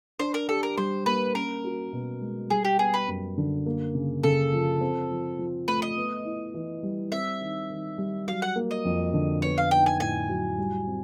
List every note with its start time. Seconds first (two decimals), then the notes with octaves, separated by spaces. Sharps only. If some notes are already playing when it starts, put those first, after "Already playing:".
0.19 D4 C5
0.34 A#4
0.48 G4 A4
0.63 A#4
0.77 G3 C5
1.06 A#3 B4
1.35 C#4 A#4
1.64 F#4
1.93 B2
2.21 G#3
2.50 G3 G#4
2.65 G4
2.79 B3 G#4
2.94 B4
3.08 F#2
3.38 D3
3.66 A#3
3.95 C#3
4.23 C#3 A4
4.53 F3
4.81 C4
5.11 F3
5.39 F3
5.68 A3 B4
5.82 D#5
5.97 B3
6.25 E4
6.54 E3
6.83 G3
7.12 C4 E5
7.41 D#3
7.70 D#3
7.98 G3
8.28 F#3 F5
8.42 F#5
8.56 A#3
8.71 D#5
8.85 F2
9.13 D3
9.42 B3 C#5
9.58 F5
9.71 D#4 G5
9.86 G#5
10.00 A2 G#5
10.29 F#3
10.58 G3
10.87 C4